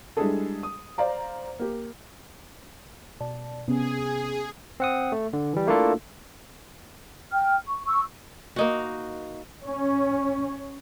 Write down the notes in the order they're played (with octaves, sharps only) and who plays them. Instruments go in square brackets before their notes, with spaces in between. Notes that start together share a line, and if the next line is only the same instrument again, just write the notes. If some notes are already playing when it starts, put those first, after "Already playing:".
[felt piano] G3 G#3 D4 E4 G#4 A4
D#6
C5 D5 F5 A#5
A#3 G4
[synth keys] B2 D5 A5
[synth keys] C3 B3 C#4 [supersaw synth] G#4
[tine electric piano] C4 F#5 D#6
A3
D3
E3 G3
A3 A#3 D4 E4 F4 A4
[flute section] G5 F6
C#6
C#6 E6
[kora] A#3 D#4 F#4
[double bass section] C#4